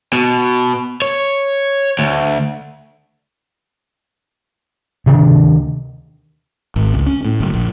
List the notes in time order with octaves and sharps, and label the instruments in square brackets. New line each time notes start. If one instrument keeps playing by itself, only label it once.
[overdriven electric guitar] B2
C#5
D2
[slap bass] D2 C3 D#3 D4
[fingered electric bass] G#1
C#2
C#4
A2
F#1
A#1